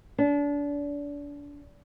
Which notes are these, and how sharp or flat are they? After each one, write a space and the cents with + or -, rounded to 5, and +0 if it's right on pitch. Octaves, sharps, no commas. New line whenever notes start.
D4 -30